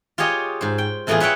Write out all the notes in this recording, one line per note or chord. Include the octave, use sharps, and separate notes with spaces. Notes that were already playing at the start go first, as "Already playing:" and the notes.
F4 G4 G#4 C#5 D#5
G#2 C5
G5
E2 A2 E3 A3 F4 G#4
B4 C#5 E5 F#5 G5